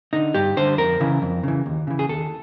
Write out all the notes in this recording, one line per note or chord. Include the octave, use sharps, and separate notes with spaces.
D3 D#4
G2 G4
D3 C5
F2 A#4
C#3 E3
F2
C#3 E3
D#2
C#3 E3
G#4
D#2 A4